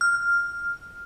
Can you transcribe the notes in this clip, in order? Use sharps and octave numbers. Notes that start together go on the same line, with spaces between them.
F6